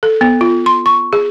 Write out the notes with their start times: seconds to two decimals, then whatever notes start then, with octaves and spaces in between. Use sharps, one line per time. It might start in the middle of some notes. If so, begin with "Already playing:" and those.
0.03 A4
0.21 B3
0.41 F4
0.66 C6
0.86 C#6
1.13 G#4